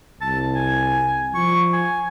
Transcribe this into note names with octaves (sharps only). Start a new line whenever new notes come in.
C2 A5
G#5
F3 C#6
G#5